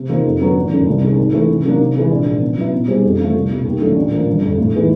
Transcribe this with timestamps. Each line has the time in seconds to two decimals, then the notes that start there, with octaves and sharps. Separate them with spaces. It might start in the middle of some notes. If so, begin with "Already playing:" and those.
Already playing: C3
0.09 F3 A#3 D#4
0.25 F2
0.41 D3 F#3 B3
0.56 G#1
0.71 F#2 D3 F#3
0.87 C2
1.02 C3 D#3 G#3
1.17 G#2
1.33 E3 A3
1.49 C3
1.65 D#3 F#3 A#3 D4
1.79 C3
1.95 E3 G#3
2.11 A#1
2.26 G#2 D#3
2.42 B2
2.57 F#3 B3 E4
2.72 B2
2.88 G3 C4 D#4 G#4
3.04 F2
3.19 D3 F3 A3
3.34 C2
3.50 B2 G3
3.65 D#2
3.81 D3 F#3 A3 C#4
3.96 A#1
4.11 A2 F3 A#3
4.27 G1
4.42 F2 D3
4.58 A2
4.73 E3 G#3 B3 D#4